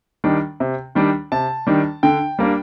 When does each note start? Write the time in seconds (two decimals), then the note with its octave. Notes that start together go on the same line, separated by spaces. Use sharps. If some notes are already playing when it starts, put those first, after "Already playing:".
0.24 D#3 G3 D4
0.60 C3
0.95 D#3 G3 D4
1.32 C3 A5
1.67 D#3 G3 D4
2.03 D3 G5
2.39 G3 A#3 D4